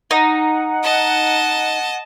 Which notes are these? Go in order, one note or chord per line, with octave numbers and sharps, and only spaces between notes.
D#4 F#5
D#5 A5